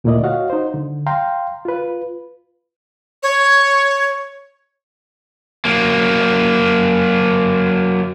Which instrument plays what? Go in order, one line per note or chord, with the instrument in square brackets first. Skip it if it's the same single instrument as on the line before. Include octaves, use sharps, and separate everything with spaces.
[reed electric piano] D2 A#2 A3 E4 D5 D#5
F#4 C#5 D#5 F5 F#5
D#4 C5
D3
F5 G5 A#5 C6
F4 B4
[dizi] C#5
[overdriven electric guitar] F#3 A#3